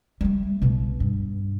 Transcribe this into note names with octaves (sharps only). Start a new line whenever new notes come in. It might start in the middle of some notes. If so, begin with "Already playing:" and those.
G3 A3
B1 B2
G2